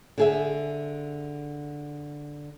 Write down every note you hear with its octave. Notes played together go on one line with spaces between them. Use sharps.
D3 G#4 E5